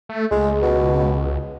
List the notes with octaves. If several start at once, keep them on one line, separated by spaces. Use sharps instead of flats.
A3
C#2 G#3
B2